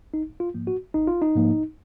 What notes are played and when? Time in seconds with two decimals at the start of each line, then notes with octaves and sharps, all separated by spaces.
0.14 G#1 D#4
0.40 F4
0.54 G#2 F3 A#3
0.67 F#4
0.94 G#1 D#4
1.08 F4
1.21 D#4
1.35 G#2 F3 A#3